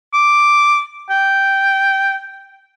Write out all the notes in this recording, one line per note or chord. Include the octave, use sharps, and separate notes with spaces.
D6
G5